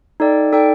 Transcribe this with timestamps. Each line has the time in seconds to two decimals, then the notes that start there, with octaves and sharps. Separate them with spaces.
0.20 D#4 A4 D5 G5
0.53 D#4 A4 D5 G5